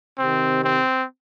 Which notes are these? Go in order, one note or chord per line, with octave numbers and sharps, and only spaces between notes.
C3 D#3 C4
C4